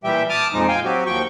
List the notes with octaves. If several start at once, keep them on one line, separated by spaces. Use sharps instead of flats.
A#2 E3 G3 G4 E5 G5
A5 D6 D#6 F6
F2 A#2 F3 G#3 D#4
F5 G5 G#5
F#3 C4 F#4 G4
D#2 F3 G5 C#6